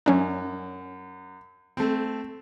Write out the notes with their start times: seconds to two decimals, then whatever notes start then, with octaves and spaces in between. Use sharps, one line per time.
0.06 F#2 F#3 C#4 D4
1.77 A3 C4